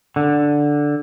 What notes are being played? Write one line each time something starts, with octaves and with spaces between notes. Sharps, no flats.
D3